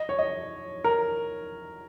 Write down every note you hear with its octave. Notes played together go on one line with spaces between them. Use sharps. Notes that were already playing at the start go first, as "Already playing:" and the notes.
Already playing: D#5
C#5
D#5
A#4